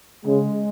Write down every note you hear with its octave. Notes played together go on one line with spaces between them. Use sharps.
C#3 G#3